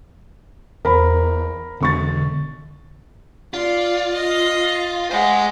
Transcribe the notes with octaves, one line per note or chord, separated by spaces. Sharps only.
E2 A#4 C5 B5
E1 D3 C#6 A6
F4 D5
D#5
G#3 C5 F#5